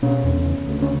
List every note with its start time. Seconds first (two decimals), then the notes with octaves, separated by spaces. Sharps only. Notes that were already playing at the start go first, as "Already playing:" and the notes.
0.02 B2 C#4
0.24 E2
0.45 C#3
0.66 D2
0.82 C#4